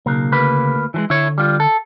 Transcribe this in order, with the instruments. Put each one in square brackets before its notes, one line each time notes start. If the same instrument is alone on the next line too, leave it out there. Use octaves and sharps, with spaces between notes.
[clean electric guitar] B1 A#3 [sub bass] C#3
[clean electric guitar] D2 A#3 B4
E3 F3 G#3
[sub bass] D3 [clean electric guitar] E4 C#5
[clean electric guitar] G3 F4
A4